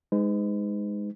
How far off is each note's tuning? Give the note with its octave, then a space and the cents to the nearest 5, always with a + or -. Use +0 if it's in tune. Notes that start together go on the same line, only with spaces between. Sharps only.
G#3 -10 D#4 +0 B4 +45